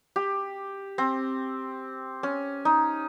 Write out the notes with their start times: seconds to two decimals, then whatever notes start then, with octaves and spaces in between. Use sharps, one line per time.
0.16 G4
0.98 C4
2.23 C#4
2.65 D#4